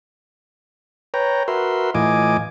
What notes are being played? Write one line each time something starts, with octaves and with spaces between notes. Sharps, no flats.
B4 C#5 G5 A#5
F#4 A#4 B4 E5 C6
A2 E3 F4 D#5 G#5 D6